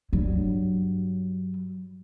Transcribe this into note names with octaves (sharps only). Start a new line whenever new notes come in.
G2 F#3